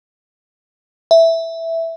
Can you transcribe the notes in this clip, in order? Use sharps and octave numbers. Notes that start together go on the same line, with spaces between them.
E5